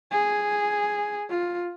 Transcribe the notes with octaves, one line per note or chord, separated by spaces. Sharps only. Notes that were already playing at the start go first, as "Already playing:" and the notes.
G#4
F4